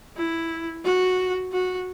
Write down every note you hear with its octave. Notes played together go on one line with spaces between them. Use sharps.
E4
F#4
F#4